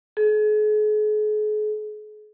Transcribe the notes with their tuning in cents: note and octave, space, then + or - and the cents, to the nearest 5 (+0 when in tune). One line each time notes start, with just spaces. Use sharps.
G#4 +40